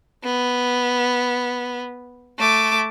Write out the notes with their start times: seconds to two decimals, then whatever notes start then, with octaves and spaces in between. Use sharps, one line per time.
0.24 B3
2.39 A3 D6